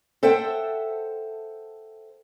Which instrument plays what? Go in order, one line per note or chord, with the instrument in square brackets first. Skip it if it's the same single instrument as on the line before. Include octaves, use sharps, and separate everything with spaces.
[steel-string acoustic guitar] A4 C5 E5 F#5 G5